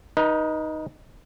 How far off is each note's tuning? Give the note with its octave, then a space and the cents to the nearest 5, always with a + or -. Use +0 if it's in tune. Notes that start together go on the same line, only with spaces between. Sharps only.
D#4 +0 B4 -40